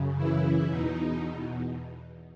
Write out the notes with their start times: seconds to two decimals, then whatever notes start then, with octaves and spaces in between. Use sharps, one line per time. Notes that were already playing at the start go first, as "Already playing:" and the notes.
Already playing: F#2 C#3
0.16 E3 E4
0.70 E2 B2 D#4